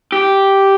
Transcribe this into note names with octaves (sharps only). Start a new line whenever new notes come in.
G4